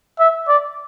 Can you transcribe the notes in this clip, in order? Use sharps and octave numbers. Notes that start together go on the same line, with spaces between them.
E5
D5